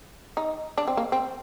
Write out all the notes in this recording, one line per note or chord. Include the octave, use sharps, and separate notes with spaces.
D#4
D4
C4
A#3
C4